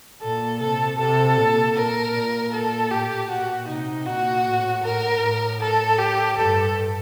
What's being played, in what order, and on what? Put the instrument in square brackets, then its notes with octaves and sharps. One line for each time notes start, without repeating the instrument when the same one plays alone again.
[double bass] A#2 [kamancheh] A4
[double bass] C3 [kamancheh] A4
[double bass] C3 [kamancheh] A4
[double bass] A#2
[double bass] A#2 [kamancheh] A#4
[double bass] A#2
[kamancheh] A4
[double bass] A2 [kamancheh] G4
[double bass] A#2 [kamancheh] F#4
[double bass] C3 [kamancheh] D#4
[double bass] A#2 [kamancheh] F#4
[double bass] A2
[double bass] A2 [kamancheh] A#4
[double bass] A2
[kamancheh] A4
G4
[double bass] G2 [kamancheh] A4